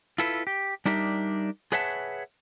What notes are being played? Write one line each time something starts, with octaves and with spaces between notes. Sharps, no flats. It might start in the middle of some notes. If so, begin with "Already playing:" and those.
E4 F4 A4 B4
G4
G3 D4 D#4 G4 A#4 E5
G#4 B4 C#5 E5 F#5 A5